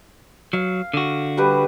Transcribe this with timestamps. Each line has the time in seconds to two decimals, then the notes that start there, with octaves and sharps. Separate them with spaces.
0.53 F#3 F5
0.94 D3 F#4
1.37 G3 G4 B4